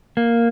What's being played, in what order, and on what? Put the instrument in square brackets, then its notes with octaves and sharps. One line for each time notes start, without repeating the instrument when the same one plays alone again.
[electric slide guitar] A#3